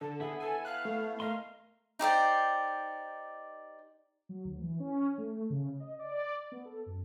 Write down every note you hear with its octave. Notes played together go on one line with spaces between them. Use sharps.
D3 A5
B3 E4 G#4
A4 G#5
F5 F#6
A3
A#4 D#5 F5 C6
D#4 G4 C5 D5
F#3
D2
E3
C#4
A3
C#3
D#5
D5
B3
A4
F#2